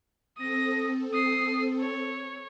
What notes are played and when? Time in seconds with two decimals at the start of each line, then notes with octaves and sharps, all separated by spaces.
0.37 C4 A4 D#6 A#6
1.13 D#6 C7
1.80 C#5